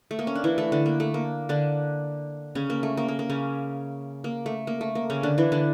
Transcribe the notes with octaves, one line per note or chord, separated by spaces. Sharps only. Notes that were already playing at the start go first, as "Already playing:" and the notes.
A3
A#3
C#4
D4
E3 E4
A3 A4
D3 D4
A#3
A3
A#3
D3 D4
C#3 C#4
A#3
A3
A#3
A#3
A#3
C#3 C#4
A#3
A3
A#3
A3
A#3
C#3 C#4
D3 D4
E3 E4
D3 D4